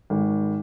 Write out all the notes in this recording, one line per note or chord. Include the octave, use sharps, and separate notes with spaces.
G#1